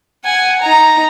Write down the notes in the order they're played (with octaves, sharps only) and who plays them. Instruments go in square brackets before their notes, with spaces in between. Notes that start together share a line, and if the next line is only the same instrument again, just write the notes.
[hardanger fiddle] F#5 G#5
D#4 A#5